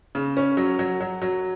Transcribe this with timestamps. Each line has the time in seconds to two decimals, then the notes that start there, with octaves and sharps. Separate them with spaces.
0.15 C#3
0.37 C#4
0.57 F#3
0.79 F#3
1.01 F#3
1.22 F#3